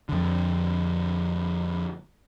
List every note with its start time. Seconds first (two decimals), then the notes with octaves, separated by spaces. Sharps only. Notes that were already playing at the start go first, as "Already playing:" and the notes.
0.09 F2 D3